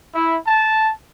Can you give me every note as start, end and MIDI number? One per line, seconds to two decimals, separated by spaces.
0.14 0.36 64
0.47 0.92 81